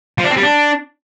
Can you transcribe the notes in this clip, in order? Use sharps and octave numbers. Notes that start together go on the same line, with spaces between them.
F3
D4
C4
G3
D4